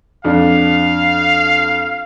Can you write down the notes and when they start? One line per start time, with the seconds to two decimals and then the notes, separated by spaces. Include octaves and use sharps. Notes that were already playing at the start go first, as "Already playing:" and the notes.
0.25 F2 D4 F5